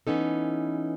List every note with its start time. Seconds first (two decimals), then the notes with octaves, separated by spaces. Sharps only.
0.07 E3 B3 C#4 D#4 A4